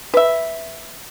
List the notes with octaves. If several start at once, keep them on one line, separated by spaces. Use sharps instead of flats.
B4 E5